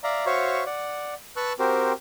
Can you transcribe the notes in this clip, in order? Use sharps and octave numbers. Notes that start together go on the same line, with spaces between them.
D5 E5 F5 A#5
F#4 C5 C#5 E5 F5 C#6
D5 F#5
B4 A5 C#6 E6 F#6
C4 F#4 G4 A#4 C5